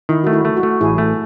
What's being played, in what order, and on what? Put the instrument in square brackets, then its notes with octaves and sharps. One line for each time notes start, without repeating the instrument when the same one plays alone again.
[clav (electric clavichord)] D#3 [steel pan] E4
[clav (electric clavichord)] A3 [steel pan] F#4
[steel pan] E4
[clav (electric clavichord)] A3
[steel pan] F#4
[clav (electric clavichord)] A3
[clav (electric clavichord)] A1 [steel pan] E4 G#4
[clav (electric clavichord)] A3